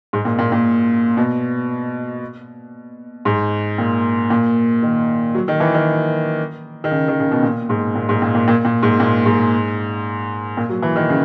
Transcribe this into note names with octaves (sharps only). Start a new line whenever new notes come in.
G#2
A#2
A#2
A#2
B2
G#2
A#2
A#2
D#3
F#3
D#3
E3
D#3
D#3
C#3
D#3
C#3
B2
A#2
G#2
A#2
G#2
A#2
A#2
A#2
A#2
G#2
A#2
G#2
A#2
F#3
E3
D#3
C#3